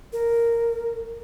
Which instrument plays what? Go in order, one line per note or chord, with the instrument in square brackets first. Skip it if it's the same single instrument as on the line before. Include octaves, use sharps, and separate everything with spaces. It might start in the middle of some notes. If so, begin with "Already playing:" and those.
[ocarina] A#4